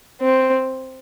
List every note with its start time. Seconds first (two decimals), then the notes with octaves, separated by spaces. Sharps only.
0.21 C4